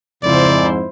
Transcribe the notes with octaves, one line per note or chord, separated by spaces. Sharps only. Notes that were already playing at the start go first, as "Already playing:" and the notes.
F2 G#2 C#3 E4 C5 D5